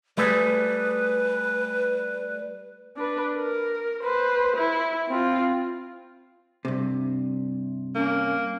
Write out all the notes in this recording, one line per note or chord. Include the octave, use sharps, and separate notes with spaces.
G3 A3 G#4 B4
D4 B4
A#4
B4 C5
E4
C4 F4
G2 C3
A#3 C#4